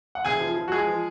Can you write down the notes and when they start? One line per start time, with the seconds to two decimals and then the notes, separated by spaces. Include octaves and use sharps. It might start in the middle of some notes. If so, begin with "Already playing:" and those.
0.15 F#5
0.25 F1 G#4 G#5
0.40 F3
0.56 F3
0.68 F#4
0.72 G#3 G#4
0.88 F3